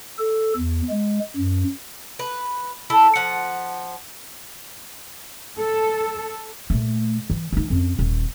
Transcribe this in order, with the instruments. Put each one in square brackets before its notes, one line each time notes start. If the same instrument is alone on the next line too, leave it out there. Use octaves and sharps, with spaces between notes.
[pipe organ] A4
E2
G#3
F#2
[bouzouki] B4
E4 A4
F3 F#5
[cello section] A4
[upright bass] A#2 A3
E3
E3 D#4
F2 C#4
D#1